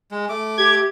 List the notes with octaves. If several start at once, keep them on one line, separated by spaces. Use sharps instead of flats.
G#3
A3 D6
G4 G#6